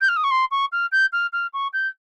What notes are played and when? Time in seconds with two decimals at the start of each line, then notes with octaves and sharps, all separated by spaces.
0.01 G6
0.09 F6
0.17 D#6
0.24 C#6
0.31 C6
0.51 C#6
0.72 F6
0.92 G6
1.13 F6
1.33 F6
1.53 C#6
1.73 G6